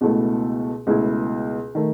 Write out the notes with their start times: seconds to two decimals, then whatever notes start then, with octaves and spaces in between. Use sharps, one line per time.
0.01 C#2 B2 A3 E4
0.87 C#2 B2 A3 E4
1.75 D#3 A3